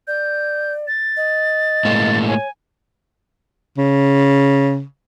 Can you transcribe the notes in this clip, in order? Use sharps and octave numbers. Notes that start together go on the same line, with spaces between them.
D5 G6
A6
D#5
A2 G#3 A#3
C#5 G#5
C#3